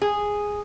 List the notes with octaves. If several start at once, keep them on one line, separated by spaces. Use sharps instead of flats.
G#4